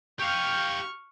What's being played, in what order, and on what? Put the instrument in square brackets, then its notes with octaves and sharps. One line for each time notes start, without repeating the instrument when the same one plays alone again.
[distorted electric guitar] G4 F5 [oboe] G5 [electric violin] C#6 F6